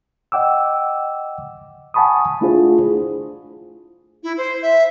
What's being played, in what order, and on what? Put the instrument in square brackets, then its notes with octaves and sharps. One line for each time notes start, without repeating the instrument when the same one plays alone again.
[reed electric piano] D#5 F#5 G5 D6 E6
F#5 G#5 A5 B5 C#6 D#6
A3 D4 E4 F4 G#4 C5
[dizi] E4
C5
E5